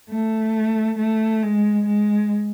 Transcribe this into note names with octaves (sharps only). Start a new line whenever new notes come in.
A3
A3
G#3
G#3